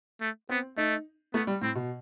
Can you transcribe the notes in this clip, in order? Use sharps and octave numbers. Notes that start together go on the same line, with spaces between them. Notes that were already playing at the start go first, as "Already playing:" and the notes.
A3
B3 C4
A3 D#4
A3 B3
G3
A2 C4
B2